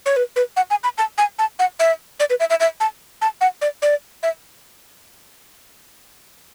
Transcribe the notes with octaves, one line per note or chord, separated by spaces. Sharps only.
C#5
B4
B4
F#5
G#5
B5
A5
G#5
A5
F#5
E5
D5
B4
E5
E5
E5
A5
A5
F#5
D5
D5
E5